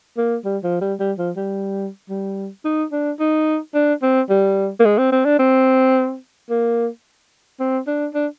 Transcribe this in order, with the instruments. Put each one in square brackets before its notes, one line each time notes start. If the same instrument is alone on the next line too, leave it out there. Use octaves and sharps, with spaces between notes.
[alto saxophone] A#3
G3
F3
G3
G3
F3
G3
G3
D#4
D4
D#4
D4
C4
G3
A#3
G#3
C4
C4
D4
C4
A#3
C4
D4
D4